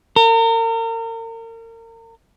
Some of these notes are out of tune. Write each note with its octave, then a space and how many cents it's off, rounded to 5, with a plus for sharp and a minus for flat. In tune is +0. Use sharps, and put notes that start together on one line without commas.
A#4 -35